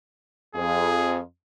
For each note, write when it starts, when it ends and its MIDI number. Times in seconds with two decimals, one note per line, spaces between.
0.55 1.20 41
0.55 1.20 68